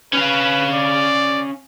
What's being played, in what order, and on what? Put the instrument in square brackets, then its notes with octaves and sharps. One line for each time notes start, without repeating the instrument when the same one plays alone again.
[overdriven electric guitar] C#4 F5 [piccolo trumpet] B4
[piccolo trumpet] D5